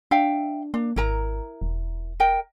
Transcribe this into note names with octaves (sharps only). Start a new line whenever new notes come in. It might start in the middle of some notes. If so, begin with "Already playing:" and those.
D4 E5 F5 G5
A#3 D4
G#1 E4 A#4 A#5
E1
A#4 D#5 G5